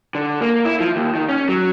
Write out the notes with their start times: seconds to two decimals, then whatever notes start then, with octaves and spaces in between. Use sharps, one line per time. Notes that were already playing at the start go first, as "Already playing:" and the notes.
0.15 D3
0.41 A#3
0.65 E4
0.80 F3
0.96 D#2
1.15 D#3
1.29 C#4
1.49 F#3